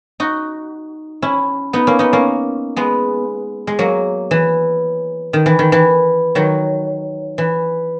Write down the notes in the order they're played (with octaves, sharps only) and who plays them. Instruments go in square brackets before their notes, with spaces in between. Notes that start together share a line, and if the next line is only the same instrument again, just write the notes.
[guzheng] D#4 F#4
C#4 E4
B3 D#4
A#3 C#4
B3 D#4
A#3 C#4
G#3 B3
G#3
F#3 A#3
E3
D#3
E3
D#3
E3
D#3 F#3
E3